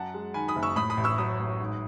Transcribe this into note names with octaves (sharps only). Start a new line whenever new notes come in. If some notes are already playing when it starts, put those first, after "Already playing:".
Already playing: F#2 F#5 A5
G#3
D#3 G#5 B5
B5 D#6
F#1
C#6 E6
A2 B5 D#6
B5 D#6
A1
C#6 E6
F#3 B5 D#6
A1
G#2